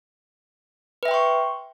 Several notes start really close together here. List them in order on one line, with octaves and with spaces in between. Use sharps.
B4 E5 G5 C6 C#6